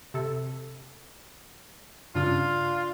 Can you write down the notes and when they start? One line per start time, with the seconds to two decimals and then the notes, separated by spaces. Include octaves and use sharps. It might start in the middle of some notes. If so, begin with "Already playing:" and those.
0.14 C3 A4
2.15 G2 C#3 D4 F4